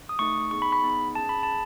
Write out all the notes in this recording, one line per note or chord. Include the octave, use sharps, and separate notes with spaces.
D#6
A3 D#4 A4 C#6
B3 D#4 G#4 C#6
B5
B5
B3 D#4 G#4
C#4 G#4 A5
B5
G#4 A5